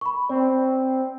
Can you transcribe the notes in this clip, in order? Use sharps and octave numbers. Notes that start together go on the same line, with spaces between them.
B5 C#6
C4 D5